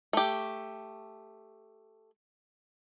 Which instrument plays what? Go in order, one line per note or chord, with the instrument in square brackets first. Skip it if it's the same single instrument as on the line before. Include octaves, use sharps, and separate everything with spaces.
[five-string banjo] A3 G4